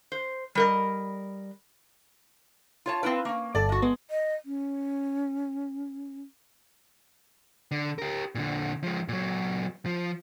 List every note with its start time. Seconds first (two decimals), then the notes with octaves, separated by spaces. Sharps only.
0.12 C5
0.55 G3 A#4 D#5
2.86 F4 C#5 A5
3.03 C4 E4 B4 F5
3.25 A#3 C#4
3.55 G1 A4 D5 A5
3.69 F#4 D#5
3.82 G#3 B3
4.10 D#5
4.45 C#4
7.71 D3
7.98 G4 A#4
8.35 A#2 D3
8.83 F3 G#3
9.08 A#2 F#3
9.86 F3